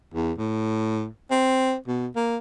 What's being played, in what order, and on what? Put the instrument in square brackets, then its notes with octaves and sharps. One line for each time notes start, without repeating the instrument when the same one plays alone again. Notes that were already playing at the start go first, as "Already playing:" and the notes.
[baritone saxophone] E2
A2
C4
B2
A#3